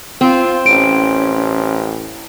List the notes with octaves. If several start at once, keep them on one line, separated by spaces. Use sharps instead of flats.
C4 F4
A1 C#4 D7